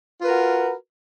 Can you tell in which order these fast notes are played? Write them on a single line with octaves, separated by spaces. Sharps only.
F4 B4 A#4 F#4